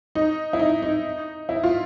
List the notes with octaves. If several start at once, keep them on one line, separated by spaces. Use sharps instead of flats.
D#4
E4
D#4
D#4
E4
F4